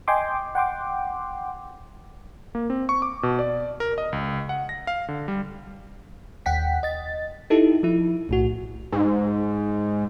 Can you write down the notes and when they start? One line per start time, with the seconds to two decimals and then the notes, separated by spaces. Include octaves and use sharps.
0.08 D#5 G5 G#5 C6 D6
0.55 F#5 G5 C6 D6
2.55 A#3
2.70 C4
2.89 C#6
3.02 D6
3.23 B2
3.39 D5
3.80 A#4
3.98 D#5
4.13 C#2
4.49 F#5
4.69 A#6
4.87 F5
5.08 D3
5.28 G3
6.46 D#2 F#5 G5 B6
6.83 D#5 A6
7.50 D#4 E4 G4 A4
7.83 F3 E4
8.29 B1 A2 F#4
8.92 G#2